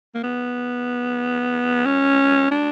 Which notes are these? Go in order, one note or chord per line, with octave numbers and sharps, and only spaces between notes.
A#3
B3
C#4
D4